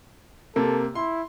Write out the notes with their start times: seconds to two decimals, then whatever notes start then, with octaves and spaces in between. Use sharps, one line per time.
0.56 C3 A#3 A4
0.95 E4 C6